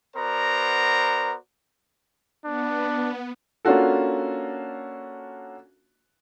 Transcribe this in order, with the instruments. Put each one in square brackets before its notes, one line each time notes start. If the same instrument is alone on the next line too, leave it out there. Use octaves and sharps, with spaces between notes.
[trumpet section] B3 F#4 A#4 C5 D5 A#5
[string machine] B3 [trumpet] D4
[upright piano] A#3 C#4 D4 F4 F#4 A4